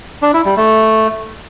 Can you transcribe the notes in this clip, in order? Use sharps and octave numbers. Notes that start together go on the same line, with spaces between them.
D4
E4
G3
A3